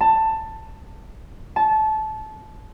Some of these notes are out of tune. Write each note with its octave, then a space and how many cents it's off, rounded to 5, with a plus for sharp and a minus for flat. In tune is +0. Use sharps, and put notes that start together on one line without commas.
A5 +15
A5 -20